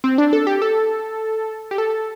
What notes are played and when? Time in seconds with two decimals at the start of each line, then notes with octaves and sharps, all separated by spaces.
0.04 C4
0.18 D4
0.33 A4
0.47 G4
0.62 A4
1.71 G4
1.78 A4